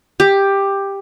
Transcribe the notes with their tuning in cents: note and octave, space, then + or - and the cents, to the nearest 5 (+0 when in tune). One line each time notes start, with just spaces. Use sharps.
G4 +10